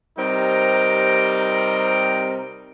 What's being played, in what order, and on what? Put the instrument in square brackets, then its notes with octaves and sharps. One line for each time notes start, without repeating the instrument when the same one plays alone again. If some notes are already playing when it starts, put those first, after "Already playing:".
[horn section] C3 G3 C4 D#4 A#4